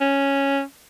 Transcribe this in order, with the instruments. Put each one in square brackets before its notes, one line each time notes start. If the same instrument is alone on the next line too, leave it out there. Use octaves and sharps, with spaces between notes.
[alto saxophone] C#4